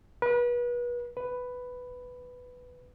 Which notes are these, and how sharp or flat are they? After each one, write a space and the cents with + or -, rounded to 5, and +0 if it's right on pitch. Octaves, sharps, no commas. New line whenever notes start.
B4 -35
B4 +5